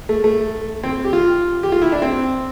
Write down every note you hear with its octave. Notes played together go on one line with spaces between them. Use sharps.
A3
A3
C4
G4
F4
G4
F4
E4
D4
C4